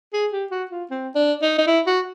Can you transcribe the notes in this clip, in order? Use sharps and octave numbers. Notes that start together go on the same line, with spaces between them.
G#4
G4
F#4
F4
C4
D4
D#4
D#4
E4
F#4